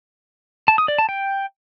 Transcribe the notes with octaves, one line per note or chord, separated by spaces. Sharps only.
A5
D#6
D5
A5
G5